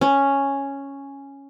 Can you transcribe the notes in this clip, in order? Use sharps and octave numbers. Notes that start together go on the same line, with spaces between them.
C#4